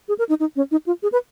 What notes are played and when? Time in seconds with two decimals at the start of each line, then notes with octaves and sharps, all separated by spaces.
0.08 G#4
0.19 A#4
0.29 D#4
0.40 D#4
0.56 C#4
0.71 D#4
0.86 F4
1.03 G#4
1.12 B4